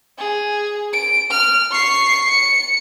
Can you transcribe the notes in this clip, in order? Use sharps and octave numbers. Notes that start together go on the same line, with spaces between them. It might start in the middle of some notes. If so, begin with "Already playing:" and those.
G#4
D7
F6
C#6 C7
C#7